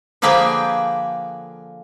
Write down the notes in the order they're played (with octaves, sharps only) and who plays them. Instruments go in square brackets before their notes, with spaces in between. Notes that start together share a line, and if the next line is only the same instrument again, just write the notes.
[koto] D3 F3 A#3 G#4 B4 G5